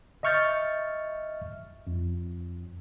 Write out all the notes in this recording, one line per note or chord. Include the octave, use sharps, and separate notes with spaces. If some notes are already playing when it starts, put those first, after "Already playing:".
D#5 E5 C#6 F6 G6 A6
F2